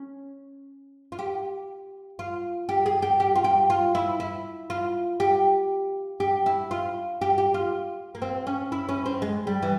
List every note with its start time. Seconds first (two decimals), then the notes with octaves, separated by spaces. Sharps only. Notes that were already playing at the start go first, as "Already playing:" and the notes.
Already playing: C#4
1.12 F4
1.19 G4
2.19 F4
2.69 G4
2.86 G#4
3.02 G4
3.20 G4
3.36 F4
3.44 G4
3.70 F4
3.95 E4
4.20 E4
4.70 F4
5.20 G4
6.20 G4
6.46 E4
6.71 F4
7.21 G4
7.38 G4
7.54 F4
8.15 A#3
8.22 C4
8.47 C#4
8.72 E4
8.89 C#4
9.06 C4
9.22 G#3
9.47 G3
9.62 E3